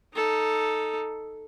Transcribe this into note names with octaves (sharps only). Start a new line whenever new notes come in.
D#4 A4